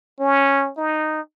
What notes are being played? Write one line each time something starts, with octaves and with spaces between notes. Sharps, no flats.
C#4
D#4